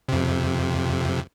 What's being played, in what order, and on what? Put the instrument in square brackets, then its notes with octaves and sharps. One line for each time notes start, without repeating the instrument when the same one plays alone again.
[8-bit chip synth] F2 C3